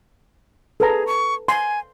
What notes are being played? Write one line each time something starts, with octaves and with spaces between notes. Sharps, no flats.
G#4 A4 B4 A#5
C#6
G#5 C6